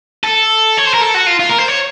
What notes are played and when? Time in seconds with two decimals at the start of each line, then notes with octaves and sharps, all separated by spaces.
0.24 A4
0.77 C#5
0.85 C5
0.94 A#4
1.01 A4
1.14 F#4
1.26 F4
1.40 F4
1.49 A#4
1.58 C5
1.68 C#5